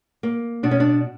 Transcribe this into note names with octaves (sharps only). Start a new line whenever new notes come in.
A#3
B2 D4
C#4
D4